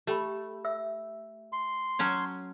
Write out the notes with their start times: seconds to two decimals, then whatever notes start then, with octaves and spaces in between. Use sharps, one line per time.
0.07 A3 G4 G5 B5
0.64 A4 E5 E6
1.52 C6
1.99 F#3 C#4 A4 C#5 A5